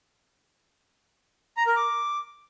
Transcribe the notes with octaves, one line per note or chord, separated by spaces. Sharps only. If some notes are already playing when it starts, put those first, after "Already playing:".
A#5
A#4
D6